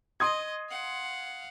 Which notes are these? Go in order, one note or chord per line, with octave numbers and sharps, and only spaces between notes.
D#5 C6 D#6 G#6
F5 F#5